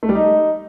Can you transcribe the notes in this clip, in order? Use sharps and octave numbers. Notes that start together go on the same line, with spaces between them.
A3
G3
D#4